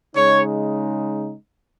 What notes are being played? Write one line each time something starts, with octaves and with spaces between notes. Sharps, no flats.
C#3 G#3 D#4 C#5